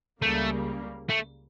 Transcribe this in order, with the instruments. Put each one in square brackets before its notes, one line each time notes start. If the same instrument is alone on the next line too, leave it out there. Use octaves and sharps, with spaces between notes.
[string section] C#2 C#3 G3 A#3 [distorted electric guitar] A3
[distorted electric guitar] A3